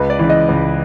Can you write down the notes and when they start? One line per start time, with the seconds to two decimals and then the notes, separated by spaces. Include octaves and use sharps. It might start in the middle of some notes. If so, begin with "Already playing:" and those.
Already playing: C#2 B4
0.10 D5
0.19 C#3 E3
0.30 D#5
0.49 C#2